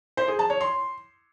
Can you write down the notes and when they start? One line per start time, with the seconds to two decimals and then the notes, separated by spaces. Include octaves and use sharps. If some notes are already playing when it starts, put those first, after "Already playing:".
0.17 C5
0.28 G#4
0.39 A5
0.50 C#5
0.61 C6